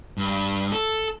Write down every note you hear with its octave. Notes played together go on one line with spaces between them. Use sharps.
G2
A4